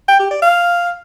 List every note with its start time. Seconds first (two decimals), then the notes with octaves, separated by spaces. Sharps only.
0.08 G5
0.19 G4
0.31 D5
0.42 F5